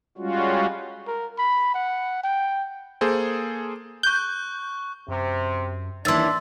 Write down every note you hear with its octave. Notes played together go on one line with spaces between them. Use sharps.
G3 G#3 C#4 F4 F#4
A#4
B5
F#5
G5
A#3 G#4 A4 C5
C#6 F#6 G6
F#2 C3
D#2 E3 D4 C6 E6 A6